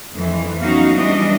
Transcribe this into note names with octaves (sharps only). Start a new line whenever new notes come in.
F2 E3
F#3 B3 C#4 D#4 F#4 F5
E3 F#3 G3 D4 D#5